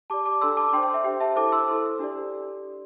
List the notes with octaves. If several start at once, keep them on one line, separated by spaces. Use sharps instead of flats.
G4 D5 A5 D6
A5 D6
D4 A4 D5 C6 E6
A5 D6
D6
D4 C5 G5 C6
G5
E5
G4 C5 G5
E5 A5
E4 A4 C5 A5 D6
C6 E6
E4 A4 C5
D4 G4 D5